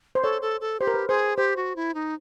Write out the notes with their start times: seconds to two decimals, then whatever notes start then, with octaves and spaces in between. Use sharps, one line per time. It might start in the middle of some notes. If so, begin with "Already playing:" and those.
0.15 C5
0.22 A4 C#5
0.42 A4
0.61 A4
0.80 G4 C5
0.87 A#4
0.94 B4
1.08 G#4 C5
1.37 G4 C5
1.56 F#4
1.76 E4
1.94 D#4